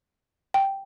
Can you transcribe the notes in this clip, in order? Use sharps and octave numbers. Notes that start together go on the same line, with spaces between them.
G5